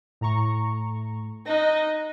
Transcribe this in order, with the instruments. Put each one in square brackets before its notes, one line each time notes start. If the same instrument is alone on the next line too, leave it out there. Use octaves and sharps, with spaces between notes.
[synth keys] A2 A#5 C#6
[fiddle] D#4 D#5 [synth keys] F#6 A#6